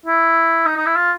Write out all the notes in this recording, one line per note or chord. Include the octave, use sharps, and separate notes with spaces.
E4
D#4
D#4
E4
F4